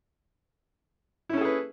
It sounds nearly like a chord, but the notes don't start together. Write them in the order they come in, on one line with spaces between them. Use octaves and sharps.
E4 C#4 A4 G#4 B4